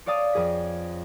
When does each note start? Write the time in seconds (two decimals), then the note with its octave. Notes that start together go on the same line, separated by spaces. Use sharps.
0.06 C#5 D5 F5 A5 D#6 A6
0.33 F2 G#4 B6